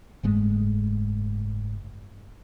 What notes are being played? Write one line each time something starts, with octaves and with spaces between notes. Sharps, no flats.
F#1 G#2 G#3 A3